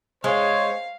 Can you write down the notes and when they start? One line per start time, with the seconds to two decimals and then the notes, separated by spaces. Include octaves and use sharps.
0.24 G#3 C5 C#5 F5